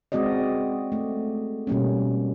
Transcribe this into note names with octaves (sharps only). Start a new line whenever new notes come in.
G#3 C4 F#4 D5 D#5
A3
B2 G3 A#3 C#4